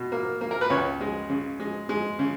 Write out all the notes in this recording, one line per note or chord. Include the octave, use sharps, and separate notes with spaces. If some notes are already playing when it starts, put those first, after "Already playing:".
Already playing: B2
A#3
A#3
A#4
B4
C#2 C#5
G#3
C#3
G#3
G#3
C#3